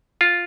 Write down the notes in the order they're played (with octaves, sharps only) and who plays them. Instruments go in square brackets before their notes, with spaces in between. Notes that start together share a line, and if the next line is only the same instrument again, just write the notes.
[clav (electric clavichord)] F4